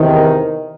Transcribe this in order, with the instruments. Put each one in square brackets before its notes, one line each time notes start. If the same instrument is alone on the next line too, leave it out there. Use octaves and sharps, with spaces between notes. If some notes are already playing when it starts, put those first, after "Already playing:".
Already playing: [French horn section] E2 C3 D#3